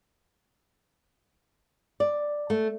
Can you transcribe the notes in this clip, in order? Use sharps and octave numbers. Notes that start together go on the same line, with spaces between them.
D5
A3